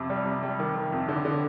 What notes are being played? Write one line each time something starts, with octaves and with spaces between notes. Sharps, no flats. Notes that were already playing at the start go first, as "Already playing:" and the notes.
Already playing: F2 C3
G3
C3
G3
D#3
D#3
F2
D3
D3